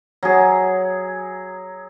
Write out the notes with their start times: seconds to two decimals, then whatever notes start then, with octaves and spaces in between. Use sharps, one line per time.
0.23 F#3 G#4